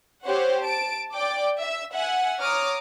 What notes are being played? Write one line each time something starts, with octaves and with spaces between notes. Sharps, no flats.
C4 G4 C5 C#5 F#5
A5 D7
D5 G5 D6
E5 E6
E5 F#5 G#5
C#5 A#5 D6 D#6 F6